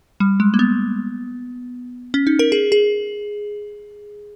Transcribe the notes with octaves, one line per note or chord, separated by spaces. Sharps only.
G3
G#3
A#3
B3
C#4
D#4
A#4
G#4
G#4